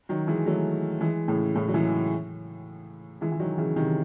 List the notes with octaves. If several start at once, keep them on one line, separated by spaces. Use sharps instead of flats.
D#3 F#3
E3 G#3
F#3 A3
E3 G#3
A2 C#3
A2 C#3
F#3
E3 G#3
E3 G#3
E3
D#3 F#3
C#3 E3
C3 D#3